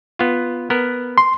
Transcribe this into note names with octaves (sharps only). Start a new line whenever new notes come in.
B3 F4
B3 A#4
C6